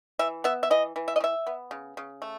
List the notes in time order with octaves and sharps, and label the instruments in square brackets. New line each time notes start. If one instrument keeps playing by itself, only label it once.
[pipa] E3 E5
B3 E5
E5
E3 D#5
E3
E5
D#5
A3
E5
B3
C#3
C#3
A3